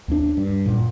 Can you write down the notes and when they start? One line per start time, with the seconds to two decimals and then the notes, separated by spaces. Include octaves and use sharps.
0.08 D#2 G#3 D4
0.37 G2
0.66 F#2 A#2